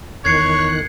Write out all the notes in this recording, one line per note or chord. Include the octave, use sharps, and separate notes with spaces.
E2 D#3 C#5 F#6 G#6 C7 C#7